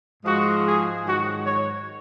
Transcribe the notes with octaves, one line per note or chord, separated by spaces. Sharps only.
G#2 F3 G#3 F#4
G#4
G#2 D#3 F#3 F#4
C#5